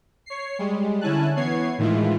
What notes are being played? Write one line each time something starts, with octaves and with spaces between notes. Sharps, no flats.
C#5 C7
G3 G#3
D3 C#4 E4 G#5 A5 F#6
E3 B3 C#5 G#6 C7
A2 D#3 E3 G#3 E4 F4